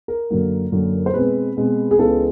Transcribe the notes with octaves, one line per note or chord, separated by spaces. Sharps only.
A#4
F#2 D3 F#3 A#3
F#2 D3 F#3 A#3
C5
B2 G#3 C4 B4
B2 G#3 C4
G#4
C#2 C#3 E3 G#3 B3 A4